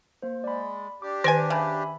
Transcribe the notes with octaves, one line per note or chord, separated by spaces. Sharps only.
A#3 C5
G#3 D5 B5
D4 G4 D6
D#3 B4 D5 G#5
C#3 E5 G#5 B5